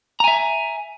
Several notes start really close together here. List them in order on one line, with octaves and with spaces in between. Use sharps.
A#5 G#5 E5